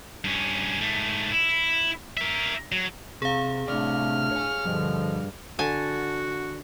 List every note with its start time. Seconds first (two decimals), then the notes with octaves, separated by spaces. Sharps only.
0.24 G2 C#4
0.81 G#2 A3
1.32 E4
2.17 A#4 E5
2.72 F#3
3.22 C3 G#4 F5
3.68 A2 C3 A3 D4 D5 F6
4.31 C#5 G#5
4.65 G2 B2 D3 F3
5.59 D3 F#4 G#5 A5